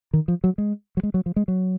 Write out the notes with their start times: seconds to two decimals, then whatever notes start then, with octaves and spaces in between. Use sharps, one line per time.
0.13 D#3
0.28 F3
0.44 F#3
0.58 G#3
0.97 F#3
1.03 G#3
1.14 F#3
1.26 F3
1.36 G#3
1.48 F#3